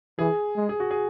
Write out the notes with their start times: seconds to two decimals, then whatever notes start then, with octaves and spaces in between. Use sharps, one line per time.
0.18 E3 G#4
0.56 G#3
0.69 G#4
0.80 F#4
0.91 G#4